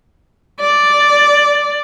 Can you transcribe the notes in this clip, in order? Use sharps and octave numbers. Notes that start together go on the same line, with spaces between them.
D5